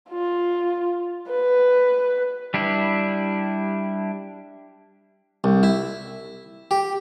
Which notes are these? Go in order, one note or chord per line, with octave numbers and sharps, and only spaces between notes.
F4
B4
G3 D4 E4
C2
E4
G4